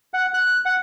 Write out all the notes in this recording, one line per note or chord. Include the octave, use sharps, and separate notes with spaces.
F#5
F#6
F#5